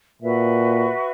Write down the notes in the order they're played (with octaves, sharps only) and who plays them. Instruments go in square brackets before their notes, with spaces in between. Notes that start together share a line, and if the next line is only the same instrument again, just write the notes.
[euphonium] A#2 [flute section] F#4 B4 E5